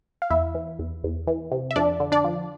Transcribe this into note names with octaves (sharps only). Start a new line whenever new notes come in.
F5
E2 E4 E5
E3
E2
E2
E3
C3
E5
F2 D4 D5
D3
D4 D5
F3